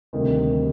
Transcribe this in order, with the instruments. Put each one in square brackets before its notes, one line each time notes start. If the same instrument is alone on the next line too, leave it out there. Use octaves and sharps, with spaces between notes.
[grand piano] D2 C3 D#3 G3 A#3